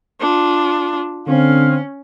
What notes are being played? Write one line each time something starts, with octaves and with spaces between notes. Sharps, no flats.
D4 F4
D3 C4 C#4 F5